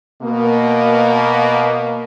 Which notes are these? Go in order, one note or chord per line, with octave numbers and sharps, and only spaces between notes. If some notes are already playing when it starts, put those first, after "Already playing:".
B2 A#3